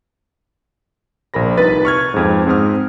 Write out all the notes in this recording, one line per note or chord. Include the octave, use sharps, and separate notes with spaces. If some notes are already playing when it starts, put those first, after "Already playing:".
A#1 A#4 B5 A#6
C2 D#4 B4 A6
C#6 F6 G#6
F2 G#2
G#2 C4 D#6 F6